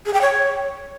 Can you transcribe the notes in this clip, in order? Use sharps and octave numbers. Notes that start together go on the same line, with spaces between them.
G#4
G5
C#5